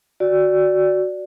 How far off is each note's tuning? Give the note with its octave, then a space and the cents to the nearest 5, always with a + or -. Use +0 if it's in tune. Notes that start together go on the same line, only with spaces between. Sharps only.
F#4 +0 D5 -5